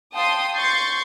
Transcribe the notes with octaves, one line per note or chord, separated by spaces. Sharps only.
F5 G5 A5 C6 D#6
C6 C#6 G6 A6 C7